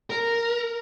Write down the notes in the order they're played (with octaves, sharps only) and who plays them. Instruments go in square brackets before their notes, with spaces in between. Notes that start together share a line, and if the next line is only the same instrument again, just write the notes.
[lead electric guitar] A#4